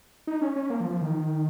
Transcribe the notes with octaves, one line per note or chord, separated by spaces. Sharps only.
D#4
C#4
C#4
A#3
F3
F3
D#3